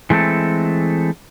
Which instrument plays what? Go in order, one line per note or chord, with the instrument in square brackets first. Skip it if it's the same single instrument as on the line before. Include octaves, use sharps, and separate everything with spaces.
[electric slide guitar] E3 G#3 A3 C4 A4